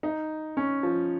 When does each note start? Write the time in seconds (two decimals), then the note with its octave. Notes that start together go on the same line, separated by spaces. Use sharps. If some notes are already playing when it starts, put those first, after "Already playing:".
0.03 D#4
0.57 C#4
0.83 F3